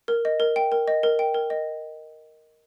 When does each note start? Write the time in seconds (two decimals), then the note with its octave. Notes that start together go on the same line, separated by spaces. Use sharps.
0.08 A#4
0.25 D#5
0.40 A#4
0.56 G5
0.72 A#4
0.88 D#5
1.03 A#4
1.19 G5
1.34 A#4
1.50 D#5